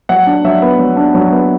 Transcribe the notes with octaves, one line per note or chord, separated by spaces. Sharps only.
F#3 F#5
D4
F#3 E5
B3
F#3
D4
F#3
B3